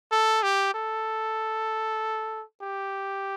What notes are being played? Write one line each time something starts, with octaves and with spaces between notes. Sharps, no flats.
A4
G4
A4
G4